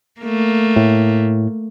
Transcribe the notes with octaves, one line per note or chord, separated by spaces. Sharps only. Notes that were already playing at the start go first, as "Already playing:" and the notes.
A3 A#3
A2